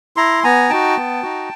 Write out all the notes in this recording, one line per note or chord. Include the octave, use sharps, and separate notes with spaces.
E4 A#5 C6
B3 G#5 A#5
D#4 F#4 G5 A5
B3
D#4 F#4